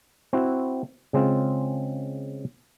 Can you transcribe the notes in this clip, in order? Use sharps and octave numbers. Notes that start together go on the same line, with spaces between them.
C4 E4 F#4
C#3 G#3 C4 F4